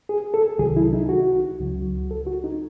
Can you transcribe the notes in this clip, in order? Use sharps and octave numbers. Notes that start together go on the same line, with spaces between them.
G#4
A4
C2 C3 D#3 F#3 G#4
E4
D#4
F#4
C#2 C#3 F#3
A4
F#4
D#4